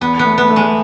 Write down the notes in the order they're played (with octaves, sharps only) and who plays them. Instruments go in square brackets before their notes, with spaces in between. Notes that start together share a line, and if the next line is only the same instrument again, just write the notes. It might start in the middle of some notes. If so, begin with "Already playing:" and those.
[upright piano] E2 [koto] B3
[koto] B3
[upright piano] A3
[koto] B3
[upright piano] A3
[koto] G#3